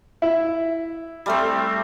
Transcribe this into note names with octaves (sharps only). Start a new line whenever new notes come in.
E4
G3 A3 C4